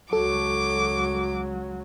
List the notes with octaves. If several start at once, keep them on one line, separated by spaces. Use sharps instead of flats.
C#2 F#3 F#4 A4 D6